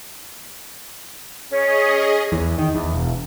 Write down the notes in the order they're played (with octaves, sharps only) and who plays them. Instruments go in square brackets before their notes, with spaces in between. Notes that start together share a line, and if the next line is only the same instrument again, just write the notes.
[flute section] C#4 C#5 [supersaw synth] G#4 D#5
[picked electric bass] E2
D#3
E2
E1